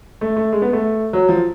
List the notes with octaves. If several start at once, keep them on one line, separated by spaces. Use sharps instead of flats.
A3
A3
G#3
B3
A3
F#3
F3